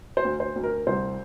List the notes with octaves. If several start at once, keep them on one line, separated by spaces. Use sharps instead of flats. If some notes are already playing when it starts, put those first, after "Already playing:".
C5
D2
C5
D2
A#4
C2 C5